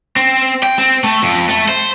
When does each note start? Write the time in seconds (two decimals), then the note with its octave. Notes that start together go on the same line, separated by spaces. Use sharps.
0.16 C4
0.63 G5
0.79 C4
1.04 A3
1.22 F2
1.49 A3
1.68 C5